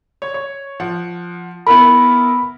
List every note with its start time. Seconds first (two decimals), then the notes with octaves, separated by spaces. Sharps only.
0.22 C#5
0.34 C#5
0.80 F3 F#5
1.67 B3 E4 A#4 B5